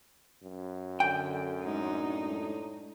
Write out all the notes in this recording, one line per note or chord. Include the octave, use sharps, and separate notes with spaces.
F#2
D3 G5
A2 G#3 D4 D#4